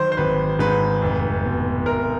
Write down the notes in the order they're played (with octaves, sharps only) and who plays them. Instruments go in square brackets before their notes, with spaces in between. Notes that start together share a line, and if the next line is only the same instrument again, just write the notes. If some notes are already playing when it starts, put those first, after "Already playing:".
Already playing: [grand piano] D#3 F#3 C5
C5
G#1 B4
G#2 B4
F1
B2
F1 A#4